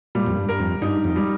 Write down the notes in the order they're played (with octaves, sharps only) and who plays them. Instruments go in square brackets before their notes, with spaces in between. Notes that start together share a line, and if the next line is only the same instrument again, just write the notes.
[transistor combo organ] A#2 [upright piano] G3
[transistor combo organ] F2
G2
[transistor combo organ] G2 [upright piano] A#4
[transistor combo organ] F2
[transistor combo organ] G2 [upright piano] D#4
[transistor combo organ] F2
[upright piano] G3